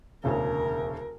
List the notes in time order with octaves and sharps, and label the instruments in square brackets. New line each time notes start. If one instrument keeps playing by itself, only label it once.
[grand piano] E1 D2 C#3 [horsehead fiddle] A#4